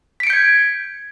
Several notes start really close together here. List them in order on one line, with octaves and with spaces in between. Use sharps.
B6 D7 C#7 G6 G#6